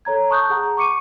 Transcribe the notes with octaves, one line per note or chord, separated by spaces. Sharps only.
A4 C#5 A#5 G#6
A5 C#6 D#6 F#6 G6
G#4 F#5 A#5
C#6 D6 C#7 D#7